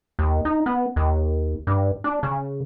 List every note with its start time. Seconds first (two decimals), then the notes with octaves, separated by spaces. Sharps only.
0.19 D#2
0.45 D#4
0.66 B3
0.96 D#2
1.67 G2
2.04 D4
2.23 C#3